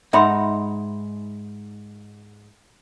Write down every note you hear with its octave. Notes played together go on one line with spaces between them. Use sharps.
G#2 D#4 E5 F#5 B5 C6